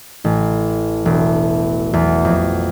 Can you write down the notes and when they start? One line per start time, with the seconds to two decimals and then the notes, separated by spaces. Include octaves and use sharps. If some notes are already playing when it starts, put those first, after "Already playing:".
0.24 A1
1.05 E1
1.93 E2
2.25 F2